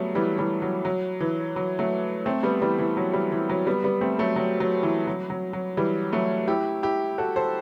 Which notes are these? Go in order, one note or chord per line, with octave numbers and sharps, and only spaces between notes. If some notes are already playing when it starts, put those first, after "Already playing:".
Already playing: F#3 G3 A3 B3
E3 G3
E3 G3
F#3
F#3
E3
F#3
F#3 A3
A3 C4
G3 B3
E3 G3
E3
F#3
E3 G3
E3
F#3
G3 B3
G3 B3
A3 C4
F#3 A3
F#3
F#3
E3
F#3
F#3
F#3
E3 G3
F#3 A3
E4 G4
E4 G4
F#4 A4
A4 C5